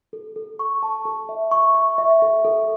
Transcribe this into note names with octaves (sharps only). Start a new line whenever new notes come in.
A4
A4
C#6
A5
A4
E5
C#6
C#6
E5
A4
A4